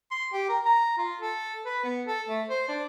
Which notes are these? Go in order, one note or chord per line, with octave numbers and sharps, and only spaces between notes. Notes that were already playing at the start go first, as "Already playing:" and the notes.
C6
G4
A#4
A#5
F4
A4
B4
B3
A4
A3
C5
D4